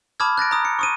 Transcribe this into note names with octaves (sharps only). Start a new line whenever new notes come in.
A5 B5 D6 D#6 F6 G#6
F#6 A6 A#6 D7
A#5 D#6
C#7
C#6 D#6 D#7